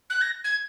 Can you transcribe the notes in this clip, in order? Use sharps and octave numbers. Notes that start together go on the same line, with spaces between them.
F#6
A#6
G#6